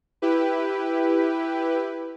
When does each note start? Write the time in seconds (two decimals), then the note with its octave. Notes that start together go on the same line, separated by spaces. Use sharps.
0.22 E4 G4 B4